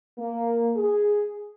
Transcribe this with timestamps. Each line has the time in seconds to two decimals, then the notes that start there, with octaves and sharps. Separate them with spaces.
0.18 A#3
0.76 G#4